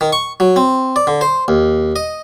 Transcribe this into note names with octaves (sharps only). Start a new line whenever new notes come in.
D#3
C#6
F#3
C4
D5
D3
C5
D#2
D#5